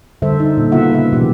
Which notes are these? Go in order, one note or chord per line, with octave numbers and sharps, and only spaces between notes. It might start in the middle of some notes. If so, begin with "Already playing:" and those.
D3 G3 A4 C5 E5
D#4
A#2
C#3 B3 E4 F4 E5 F#5
C#3 B4 E5
B2 E3 F#3 G4